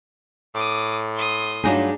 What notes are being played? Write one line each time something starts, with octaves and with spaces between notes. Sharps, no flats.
A2 D6 D#6
C6 D#6
G2 F#3 D4 D#4 F4 G#4